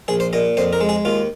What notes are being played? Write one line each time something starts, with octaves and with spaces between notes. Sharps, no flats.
A#1 G#4
C5
A#2 D#5
F2 C5
A#4
G#3
G#4
D#2 F4